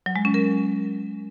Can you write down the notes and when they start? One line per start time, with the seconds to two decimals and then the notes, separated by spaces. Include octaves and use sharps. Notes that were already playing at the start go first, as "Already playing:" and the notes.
0.06 F#3
0.16 G#3
0.25 C#4
0.34 A#4